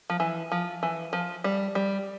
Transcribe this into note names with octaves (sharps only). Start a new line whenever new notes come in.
F3
E3
F3
E3
F3
G3
G3